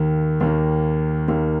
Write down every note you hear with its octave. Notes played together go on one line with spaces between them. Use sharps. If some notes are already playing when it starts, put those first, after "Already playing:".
Already playing: D#2 D#3 A#3
D#2 D#3 A#3
D#2 D#3 A#3